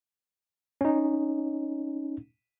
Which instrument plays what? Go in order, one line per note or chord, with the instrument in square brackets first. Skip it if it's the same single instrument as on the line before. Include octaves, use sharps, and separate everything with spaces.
[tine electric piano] C#4 D#4